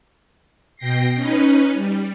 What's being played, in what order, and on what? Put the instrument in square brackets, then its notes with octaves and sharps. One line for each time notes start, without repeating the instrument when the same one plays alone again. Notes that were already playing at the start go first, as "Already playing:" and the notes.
[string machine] B2 G5 A#6 C7
C#4 D#4 B4
G3